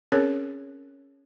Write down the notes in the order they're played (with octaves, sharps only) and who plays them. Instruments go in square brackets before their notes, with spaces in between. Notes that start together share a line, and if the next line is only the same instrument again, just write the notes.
[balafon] C4 C#4 G#4 A#4 C#5